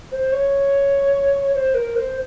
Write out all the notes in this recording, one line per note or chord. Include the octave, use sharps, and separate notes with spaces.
C5
C#5
C5
A#4
C5